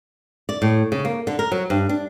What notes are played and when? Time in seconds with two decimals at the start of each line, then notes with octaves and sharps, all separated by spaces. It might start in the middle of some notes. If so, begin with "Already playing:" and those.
0.49 D5
0.62 A2
0.92 C#3
1.05 A#3
1.27 D3
1.39 A#4
1.52 F#3
1.70 G2
1.89 D4